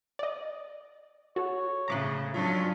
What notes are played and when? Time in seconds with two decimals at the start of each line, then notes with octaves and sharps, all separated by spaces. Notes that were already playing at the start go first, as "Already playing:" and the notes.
0.19 D5 D#5
1.36 F#4 A4 C#5
1.88 A2 C#3 A#5 D6 F#6
2.34 G2 F#3 C#4 D4 F4 C#5